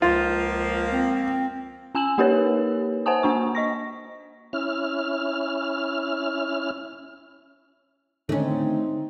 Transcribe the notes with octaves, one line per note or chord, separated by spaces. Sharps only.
C#2 F3 A#3 F4
C4
C#4 G#5 E6 E7 F#7
A#3 D#4 G4 A#4 B4 C#5
C5 F#5 G#5 A5 D#6
A#3 D4 C#6
D#5 C#6 A#6
C#4 E4 F6
D3 D#3 A3 C4 C#4 D#4